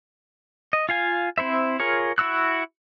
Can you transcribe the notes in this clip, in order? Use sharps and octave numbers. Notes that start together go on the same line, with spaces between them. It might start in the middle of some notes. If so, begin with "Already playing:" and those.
D#5
F4 F5 G#5
C4 E4 C5 E5
F4 G#4 A#4 C#5
E4 F#4 E6 F#6